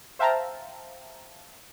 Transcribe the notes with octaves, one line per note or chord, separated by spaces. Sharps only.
C5 E5 F5 G5 A5 A#5